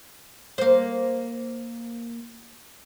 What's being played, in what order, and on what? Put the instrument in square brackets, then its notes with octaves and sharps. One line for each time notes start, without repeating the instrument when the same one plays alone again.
[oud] A#3 C5